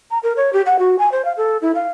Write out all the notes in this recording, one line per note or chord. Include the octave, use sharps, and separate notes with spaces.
A#5
A#4
C#5
G4
F#5
F#4
G#5
C5
F5
A4
E4
F5